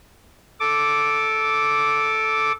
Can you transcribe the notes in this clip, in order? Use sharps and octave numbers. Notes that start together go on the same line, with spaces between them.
A4 D6